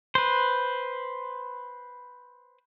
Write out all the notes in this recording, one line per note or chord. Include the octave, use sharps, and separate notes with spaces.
B4 C5